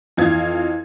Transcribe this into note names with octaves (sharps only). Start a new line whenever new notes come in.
F2 E3 F5 G#6